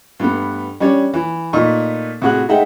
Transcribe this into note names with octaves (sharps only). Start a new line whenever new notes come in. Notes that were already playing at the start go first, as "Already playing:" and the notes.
G2 A3 B3
G3 C#4 D4 C#5
E3
A#2 A3 D#4 C#6
A2 C3 F#4 G#4 F#6
G#3 A3 D#4 E5 F#5 G5